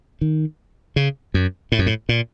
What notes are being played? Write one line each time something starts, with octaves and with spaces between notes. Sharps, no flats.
D#3
C#3
F#2
A2
F#2
A2
A#2